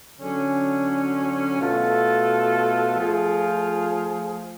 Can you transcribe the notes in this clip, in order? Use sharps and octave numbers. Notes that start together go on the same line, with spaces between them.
D3 F#3 C#4
B2 A3 F4 A4
F3 A3 F4 G#4